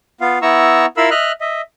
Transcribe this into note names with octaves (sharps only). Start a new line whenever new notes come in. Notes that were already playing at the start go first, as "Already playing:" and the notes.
B3 F4 F5
B3 E4 A#5 C#6 E6
E4 F4 A#4 F5 B5 E6
D#5 E5 F6 F#6
D#5 E5